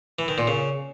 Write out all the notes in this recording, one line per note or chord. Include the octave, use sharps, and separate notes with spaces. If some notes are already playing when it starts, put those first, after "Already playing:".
E3
D#3
A#2
C#3